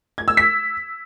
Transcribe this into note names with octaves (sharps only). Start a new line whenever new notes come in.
G#6
E6
B6